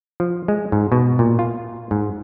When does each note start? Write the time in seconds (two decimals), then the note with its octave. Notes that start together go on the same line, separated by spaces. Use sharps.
0.20 F3
0.48 G#3
0.72 G#2
0.92 B2
1.19 A#2
1.39 F4
1.91 G#2